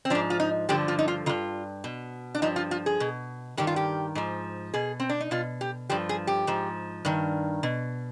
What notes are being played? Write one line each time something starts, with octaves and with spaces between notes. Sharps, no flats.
C4
G#2 F3 D4
F4
D#4
G2 D3 F3 G4
F4
D#4
F4
G2 D#3 F4
B2
D4
G2 F3 D#4
F4
F4
G#4
B2
G2 D#3 G4
F4
G4
G#2 F3
B2 G#4
C4
D4
D#4
B2 F4
G4
G2 F3 G4
G#4
G4
G#2 F3
G2 D#3
B2